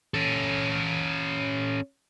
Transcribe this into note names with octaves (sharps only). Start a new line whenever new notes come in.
C#4 A4